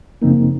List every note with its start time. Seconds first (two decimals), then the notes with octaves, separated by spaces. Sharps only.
0.22 F#2 C#3 F3 A#3 C4 D#4